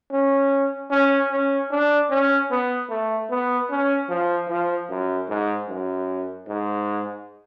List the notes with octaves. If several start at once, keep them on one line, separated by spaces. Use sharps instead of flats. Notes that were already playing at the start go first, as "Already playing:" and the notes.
C#4
C#4
C#4
D4
C#4
B3
A3
B3
C#4
F3
F3
F#2
G#2
F#2
G#2